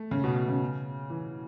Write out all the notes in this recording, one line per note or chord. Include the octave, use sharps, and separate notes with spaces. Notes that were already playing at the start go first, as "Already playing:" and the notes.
Already playing: A3
C#3
B2
B2
C#3
E3